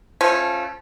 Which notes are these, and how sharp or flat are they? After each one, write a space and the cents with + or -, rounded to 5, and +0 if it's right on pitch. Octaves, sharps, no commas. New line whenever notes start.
F3 +0 A3 -20 C#4 -15